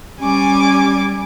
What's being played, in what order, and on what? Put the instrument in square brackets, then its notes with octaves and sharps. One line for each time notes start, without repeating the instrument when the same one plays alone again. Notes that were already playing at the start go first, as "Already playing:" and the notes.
[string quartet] G3 G#5 D6 [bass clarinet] C#4